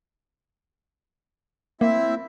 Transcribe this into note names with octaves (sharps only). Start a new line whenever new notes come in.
A#3 C4 E4 E5